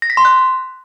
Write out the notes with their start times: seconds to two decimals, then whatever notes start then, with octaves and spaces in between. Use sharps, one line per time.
0.02 A#6
0.10 B6
0.17 C6
0.25 F#6